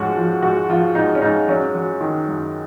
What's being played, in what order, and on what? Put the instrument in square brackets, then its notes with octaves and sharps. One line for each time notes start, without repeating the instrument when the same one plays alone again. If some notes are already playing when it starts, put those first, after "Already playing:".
Already playing: [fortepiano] G#2 F3 C#4 F#4
F3
G#2 F#4
F3 F4
G#2 D#4
C#4
G#2 D#4
F#3 C#4
F#3
D#3
F#2